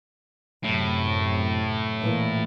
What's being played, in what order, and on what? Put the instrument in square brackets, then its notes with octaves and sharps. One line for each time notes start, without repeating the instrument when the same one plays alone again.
[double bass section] F#2 C3 [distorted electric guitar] A2
[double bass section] A#2 E3